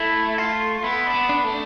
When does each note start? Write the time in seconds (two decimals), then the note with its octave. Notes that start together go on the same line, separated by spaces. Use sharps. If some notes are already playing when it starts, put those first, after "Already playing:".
Already playing: A3 E4
0.38 F4
0.84 B3 E4
1.07 D4
1.14 B3
1.29 D4
1.44 A3